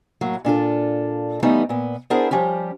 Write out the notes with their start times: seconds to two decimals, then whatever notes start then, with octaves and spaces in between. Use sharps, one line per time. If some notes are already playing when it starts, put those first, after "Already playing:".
0.21 A2 F#3 A#3
0.45 A#2 D4 F4 A4
1.42 E3 G3 A3 B3 D#4
1.69 A#2 B3
2.10 B3 D4 E4 G#4 A#4 C5
2.31 F3 G3 C#4 G4